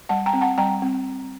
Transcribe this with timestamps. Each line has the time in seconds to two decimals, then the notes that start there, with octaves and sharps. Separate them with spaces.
0.09 G3 F#5 A5
0.26 G5 A#5
0.33 C4
0.41 F#5 A5
0.58 G3 G5 A#5
0.82 C4